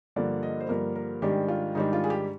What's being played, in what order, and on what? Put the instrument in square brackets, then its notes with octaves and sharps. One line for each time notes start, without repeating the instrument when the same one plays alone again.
[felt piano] G2 D3 F3 A#3 D5
D#5
C5
G2 D3 F3 A#3 A#4
A#4
G#2 D#3 G3 D4 G4
F4
G#2 D#3 G3 D4 D#4
F4
G#4
G4